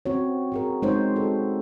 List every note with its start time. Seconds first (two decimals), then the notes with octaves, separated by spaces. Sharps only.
0.06 C4 F#4 C#5
0.52 F#4 G#4 A#4
0.82 G#3 C4 D#4 C5 C#5
1.16 F#4 A4